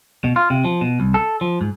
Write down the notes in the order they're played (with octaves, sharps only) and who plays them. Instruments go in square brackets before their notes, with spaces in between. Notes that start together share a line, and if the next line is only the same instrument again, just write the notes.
[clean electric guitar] B2
F4
C3
F3
B2
C2
A4
F3
G#2